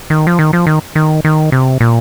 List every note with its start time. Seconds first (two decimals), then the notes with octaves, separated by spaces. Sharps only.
0.10 D#3
0.27 F3
0.39 D#3
0.53 F3
0.67 D#3
0.95 D#3
1.25 D#3
1.52 C3
1.80 A#2